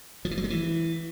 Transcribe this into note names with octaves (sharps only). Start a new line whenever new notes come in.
F3
E3
F#3
G#3
E3